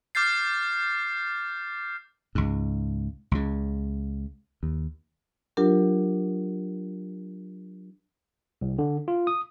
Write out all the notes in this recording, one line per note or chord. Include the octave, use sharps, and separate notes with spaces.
D6 F6 G6 A6 C7
C#2 G#2
C#2 C#3
D#2
F#3 D4 F4 G4 A#4
C2
D3
F4
D#6